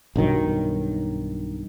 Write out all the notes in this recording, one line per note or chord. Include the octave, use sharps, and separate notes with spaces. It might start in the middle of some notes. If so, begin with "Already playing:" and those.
B1 G2 D#3 F#3